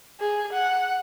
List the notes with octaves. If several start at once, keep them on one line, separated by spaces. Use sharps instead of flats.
G#4
F#5